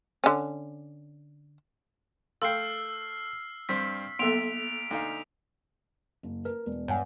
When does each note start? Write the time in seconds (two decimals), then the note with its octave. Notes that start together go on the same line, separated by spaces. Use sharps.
0.24 D3 C#4
2.42 A3 F5 G5 C6 E6 F6 C7
3.69 G2 C4 D4 B6
4.19 B1 A#3 B3 A4 E5 C6 D7 F7
4.91 D2 D#4 F5
6.23 F#1
6.45 A#4 B4
6.66 E1
6.88 G2 C#5 F#5 G#5